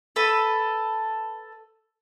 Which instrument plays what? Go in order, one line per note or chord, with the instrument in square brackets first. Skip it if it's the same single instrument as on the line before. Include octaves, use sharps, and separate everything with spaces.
[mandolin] A4 B4 B5